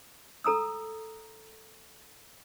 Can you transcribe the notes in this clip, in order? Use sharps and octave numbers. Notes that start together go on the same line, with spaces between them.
A4 A#5 D#6 E6